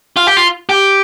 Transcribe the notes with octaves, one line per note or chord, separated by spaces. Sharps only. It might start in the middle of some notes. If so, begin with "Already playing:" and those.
F4
G4
F4
G4